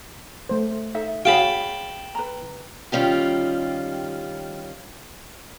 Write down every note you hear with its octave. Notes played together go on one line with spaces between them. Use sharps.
A3 C5
D#4 A4 E5
F#4 G#4 C#5 F5 G5 A5 B5
B4 A#5
D#3 G3 C#4 F4 G4